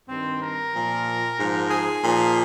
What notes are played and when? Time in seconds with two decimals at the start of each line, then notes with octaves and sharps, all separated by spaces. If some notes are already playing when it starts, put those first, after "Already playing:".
0.09 G2 D#3 C4
0.41 A#4
0.74 A#2 F3
1.39 G#2 F3
1.71 G#4
2.03 A#2 F3